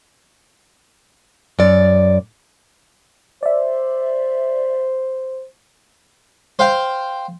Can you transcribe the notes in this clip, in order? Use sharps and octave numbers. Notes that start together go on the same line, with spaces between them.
F#2 D5
C5 D5 E5
C5 F5 G5